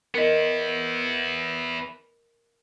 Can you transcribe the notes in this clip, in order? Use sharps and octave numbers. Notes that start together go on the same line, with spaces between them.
B3 E4 A#4 D#5